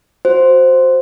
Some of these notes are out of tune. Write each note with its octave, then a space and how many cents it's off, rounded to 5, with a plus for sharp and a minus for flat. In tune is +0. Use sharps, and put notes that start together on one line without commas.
F#4 -10 C5 +0